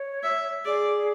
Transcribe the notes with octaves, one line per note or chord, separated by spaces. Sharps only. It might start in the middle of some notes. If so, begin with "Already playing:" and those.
Already playing: C#5
E5
G#4 D5